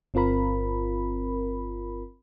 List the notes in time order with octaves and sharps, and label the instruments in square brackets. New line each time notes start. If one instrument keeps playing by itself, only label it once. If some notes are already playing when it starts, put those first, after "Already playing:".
[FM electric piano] G1 C4 F4 A#4 B5